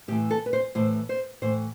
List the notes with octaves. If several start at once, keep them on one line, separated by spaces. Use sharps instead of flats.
A2 E3 G4
A4
B4
C5
A2 E3 C5
C5
A2 E3 C5